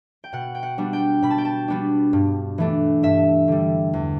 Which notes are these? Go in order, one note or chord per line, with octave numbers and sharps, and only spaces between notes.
G5
B2 F#5
G5
F#5
G3 B3 D4
G5
B2 B5
A5
G5
A5
G3 B3 D4
G2
E3 A3 D4
G2 E5
D3 G3
E2